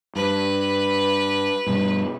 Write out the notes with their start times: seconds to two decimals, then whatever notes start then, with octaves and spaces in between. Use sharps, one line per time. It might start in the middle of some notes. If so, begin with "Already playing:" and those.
0.16 G2 B4
1.67 G2 B2 G3